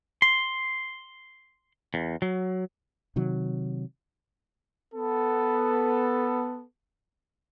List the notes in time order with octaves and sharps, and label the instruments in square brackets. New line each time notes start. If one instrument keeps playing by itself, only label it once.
[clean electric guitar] C6
E2
F#3
[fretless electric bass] C3 D#3 F#3
[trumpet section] B3 A4